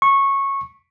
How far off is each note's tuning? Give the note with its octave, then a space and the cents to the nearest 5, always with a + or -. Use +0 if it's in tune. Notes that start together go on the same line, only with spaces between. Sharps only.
C#6 -15